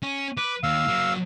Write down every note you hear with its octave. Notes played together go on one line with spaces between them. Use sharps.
C#4
B4 D6
D#2 F5 E6
F#3 A#3